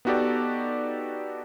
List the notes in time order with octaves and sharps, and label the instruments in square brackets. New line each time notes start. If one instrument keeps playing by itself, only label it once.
[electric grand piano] B3 D#4 F#4 G4 A4 D5